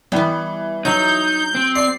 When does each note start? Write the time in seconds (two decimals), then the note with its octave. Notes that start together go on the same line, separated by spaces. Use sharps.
0.12 E3 G3 B3
0.85 F#3 D#4 G6
1.55 C4
1.75 D5 C7